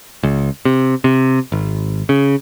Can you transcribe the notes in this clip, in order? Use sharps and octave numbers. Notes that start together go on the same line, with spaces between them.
C#2
C3
C3
G#1
C#3